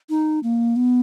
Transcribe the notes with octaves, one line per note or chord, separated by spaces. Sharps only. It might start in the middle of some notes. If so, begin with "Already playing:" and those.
D#4
A#3
B3